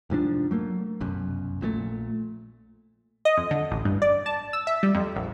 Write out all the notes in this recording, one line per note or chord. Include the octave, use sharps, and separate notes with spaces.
F1 G#2 F3 D4
F#3 A3 A#3
F1 B1 F#2
A#1 A#2 E3 A3
D#5
F2
D3
A1
G2
D5
A5
E6
E5
G3
F2
A#1